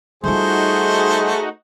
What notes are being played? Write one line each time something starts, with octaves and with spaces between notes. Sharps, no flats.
G3 A3 D#4 F4 F#4 G#4 C5